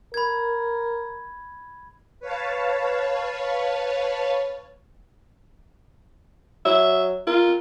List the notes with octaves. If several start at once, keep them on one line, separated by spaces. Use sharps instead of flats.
A#4 B5 G#6
B4 C#5 F5 A5
F#3 E5
F4 A#4